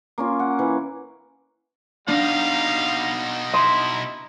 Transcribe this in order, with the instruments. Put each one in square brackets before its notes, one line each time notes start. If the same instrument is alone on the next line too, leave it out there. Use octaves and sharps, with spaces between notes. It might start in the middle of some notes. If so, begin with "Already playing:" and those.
[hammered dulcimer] A#3 C#4 F4
F#5
E3
[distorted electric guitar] B2 D#4 [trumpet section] G3 F5 [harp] D4
[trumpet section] E4 [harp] D#5 C6